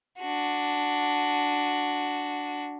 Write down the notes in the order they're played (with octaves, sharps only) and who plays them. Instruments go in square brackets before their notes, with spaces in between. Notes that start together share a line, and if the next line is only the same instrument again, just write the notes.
[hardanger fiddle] D4 F#4